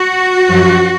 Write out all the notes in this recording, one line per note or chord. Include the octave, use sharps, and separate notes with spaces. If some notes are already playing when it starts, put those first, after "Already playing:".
Already playing: F#4
F#2 F3